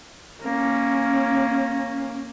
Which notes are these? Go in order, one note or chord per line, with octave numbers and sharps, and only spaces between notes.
A#3 C#4